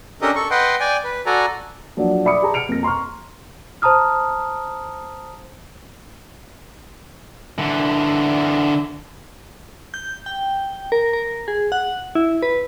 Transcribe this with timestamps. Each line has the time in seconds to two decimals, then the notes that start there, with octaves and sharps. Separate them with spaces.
0.22 C#4 D4 G4 A4 A#4 D#5
0.36 A4 C#6
0.51 B4 D#5 F#5 G5 C6
0.80 D5 G5 G#5
1.04 B4
1.26 F#4 A4 D5 G#5 A#5
1.97 F3 F#3 A#3 D4
2.25 D5 E5 B5 D6 D#6 C#7
2.42 G4 G#4 A5 A#5
2.54 F6 C#7 D7 F7
2.69 F2 A#3 A#6
2.83 A#5 C6 C#6 F6
3.82 C5 A5 A#5 D#6 F6
7.59 D3 E3
9.94 G6
10.26 G5
10.92 A#4
11.13 A#4
11.48 G#4
11.72 F#5
12.15 E4
12.43 B4